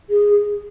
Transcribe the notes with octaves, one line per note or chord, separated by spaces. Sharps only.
G#4